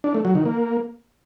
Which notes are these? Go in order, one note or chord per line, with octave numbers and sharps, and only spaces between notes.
D4
A3
F#3
D#3
A#3